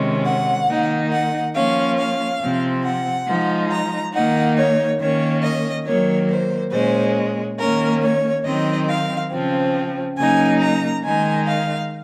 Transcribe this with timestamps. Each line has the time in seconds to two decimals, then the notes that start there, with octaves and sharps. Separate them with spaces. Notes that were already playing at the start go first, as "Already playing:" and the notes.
Already playing: C3 D#3 G#3 C#4
0.25 F#5
0.68 D#3 A#3 D#4
1.11 F#5
1.54 F3 A#3 C#4 F5
1.97 F5
2.41 C3 F3 C4
2.84 F#5
3.27 F3 G#3 D#4
3.70 A#5
4.13 D#3 A#3 D#4 F#5
4.57 C#5
4.99 D#3 A#3 C#4 C#5
5.42 D#5
5.86 D#3 F#3 A#3 C#5
6.29 C5
6.72 A#2 G#3 C#4 C5
7.58 D#3 A#3 C#4 A#4
8.01 C#5
8.44 D#3 F#3 C4 D#4 D#5
8.88 F5
9.31 C#3 F3 C4
10.17 C#3 F#3 A#3 D#4 G#5
10.60 A#5
11.03 D#3 G#3 D#4 G#5
11.47 F5